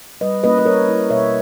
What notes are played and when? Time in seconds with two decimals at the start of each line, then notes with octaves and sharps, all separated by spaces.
0.21 G3 B4 D#5
0.44 A#3 C#4 E4 B4 D#5
0.58 D#5
0.65 G3 A#4 C#5
0.89 C#4 E4
1.10 B2 C#5 E5